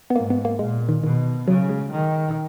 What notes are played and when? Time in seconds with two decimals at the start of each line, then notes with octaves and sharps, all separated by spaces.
0.10 B3
0.15 G#2 A#3
0.30 B3
0.45 A#3
0.59 A#2 G#3
0.89 D#3
1.03 B2 D#3
1.47 C#3 F#3
1.69 G#3
1.91 D#3